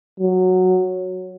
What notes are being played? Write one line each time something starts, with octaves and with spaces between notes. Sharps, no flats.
F#3